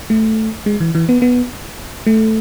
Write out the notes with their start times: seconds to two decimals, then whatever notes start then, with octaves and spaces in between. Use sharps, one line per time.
0.10 A3
0.66 G#3
0.80 E3
0.95 E3
1.09 B3
1.22 B3
2.07 A3